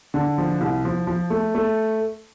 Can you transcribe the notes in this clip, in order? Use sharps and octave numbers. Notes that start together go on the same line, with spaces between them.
D3
F3
C2
F3
F3
A3
A3